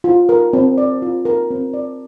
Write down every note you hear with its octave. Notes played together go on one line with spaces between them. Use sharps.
F4
A#4
C4
D5
F4
A#4
C4
D5